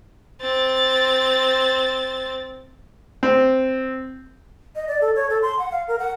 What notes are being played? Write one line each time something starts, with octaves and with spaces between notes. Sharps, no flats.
C4 A6
C4
D#5
D5
A4
C#5
A4
C6
F#5
F5
A#4
F#5